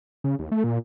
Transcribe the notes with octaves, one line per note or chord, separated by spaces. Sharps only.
C#3
D#2
A3
A#2